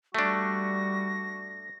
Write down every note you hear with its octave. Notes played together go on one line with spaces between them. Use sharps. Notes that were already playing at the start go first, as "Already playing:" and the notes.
G3 A3 D4 F#4 A#6